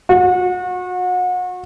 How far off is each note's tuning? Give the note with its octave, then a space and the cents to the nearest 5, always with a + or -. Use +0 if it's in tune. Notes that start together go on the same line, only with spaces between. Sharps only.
F#4 -35